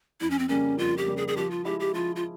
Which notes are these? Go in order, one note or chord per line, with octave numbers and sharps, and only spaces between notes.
F2 E4
C#4
C4
C#3 G3 A#3 C#4
F2 F4
G4
C#3 G3 A#3
G#4
G#4
F3 G4
F4
G#3 E4 G4
G4
F3 F4
F4